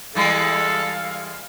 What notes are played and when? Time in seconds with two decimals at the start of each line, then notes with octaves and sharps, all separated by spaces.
0.15 E3 G3 G#3 A4 F5